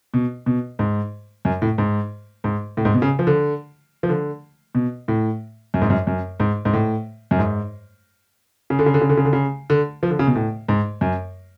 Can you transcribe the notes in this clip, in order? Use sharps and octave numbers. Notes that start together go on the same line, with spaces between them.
B2
B2
G#2
F#2
A2
G#2
G#2
A2
G#2
B2
C#3
F3
D3
F3
D3
B2
A2
F#2
G#2
F#2
F#2
G#2
G#2
A2
F#2
G#2
C#3
D3
C#3
D3
C#3
D3
C#3
D3
C#3
D3
F3
D3
C#3
B2
A2
G#2
F#2